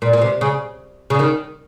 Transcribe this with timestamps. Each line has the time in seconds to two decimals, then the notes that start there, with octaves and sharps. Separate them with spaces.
0.02 A#2
0.13 A#2
0.21 C3
0.41 C#3
1.10 C#3
1.19 D#3